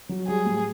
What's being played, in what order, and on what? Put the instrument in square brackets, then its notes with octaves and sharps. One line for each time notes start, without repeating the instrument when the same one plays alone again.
[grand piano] F#3
[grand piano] G3 [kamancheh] G#4
[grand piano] A2